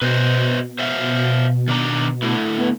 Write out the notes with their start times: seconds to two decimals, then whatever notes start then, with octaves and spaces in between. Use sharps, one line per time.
0.02 B2 B4 C5 D#5
0.79 C5 E5 F5
1.68 D#3 D4 A#5
2.22 D3 A3 E4
2.58 B3